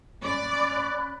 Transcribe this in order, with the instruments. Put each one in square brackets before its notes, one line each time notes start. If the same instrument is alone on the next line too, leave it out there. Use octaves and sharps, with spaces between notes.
[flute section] C#4 B5 F#6 [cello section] D5